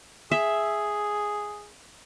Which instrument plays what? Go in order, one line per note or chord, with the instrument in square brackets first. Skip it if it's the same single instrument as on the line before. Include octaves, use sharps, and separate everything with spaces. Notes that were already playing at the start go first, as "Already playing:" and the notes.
[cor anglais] G#4 [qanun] E5